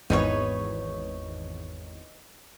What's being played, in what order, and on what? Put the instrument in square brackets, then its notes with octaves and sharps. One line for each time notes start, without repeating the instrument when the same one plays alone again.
[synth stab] G#1 E2 [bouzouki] D#4 B4 C#5